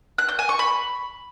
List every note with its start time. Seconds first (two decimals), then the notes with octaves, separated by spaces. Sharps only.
0.18 F#6
0.29 G6
0.39 G#5
0.49 C#6
0.59 B5